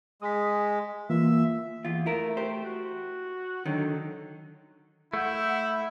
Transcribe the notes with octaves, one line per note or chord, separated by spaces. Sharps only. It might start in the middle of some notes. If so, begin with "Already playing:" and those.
G#3 D#6 B6
E3 A#3 F4 E5
E2 F4
A3 E4 A#4
G4 C5
F#4
D3 D#3 F#3
A3 E4 F#5 G6